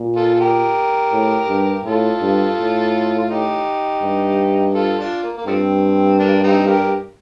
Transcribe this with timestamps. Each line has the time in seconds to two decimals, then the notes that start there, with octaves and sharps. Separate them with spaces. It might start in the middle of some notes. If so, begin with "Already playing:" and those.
Already playing: A#2
0.16 F4 A4
0.35 A4
0.40 G4 A#4
1.12 A2
1.49 G2
1.85 A2 F4 A4
2.22 G2
2.57 A2
3.18 F4
3.30 D#4 G4
4.02 G2
4.74 F4 A4
4.99 D4 F4
5.23 A#3
5.38 A#3
5.47 G2 F3 A3 C4
6.19 A#3 D4
6.43 C4 D#4
6.67 G4 A#4